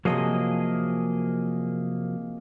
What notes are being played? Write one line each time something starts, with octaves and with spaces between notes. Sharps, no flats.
C3 F3 F#3 A#3 G#4 D#5